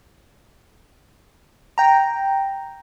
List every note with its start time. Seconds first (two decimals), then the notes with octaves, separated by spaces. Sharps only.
1.78 G5 A#5